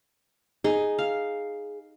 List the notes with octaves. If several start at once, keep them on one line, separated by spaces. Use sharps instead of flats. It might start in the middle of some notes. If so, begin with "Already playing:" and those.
D#4 G#4
F5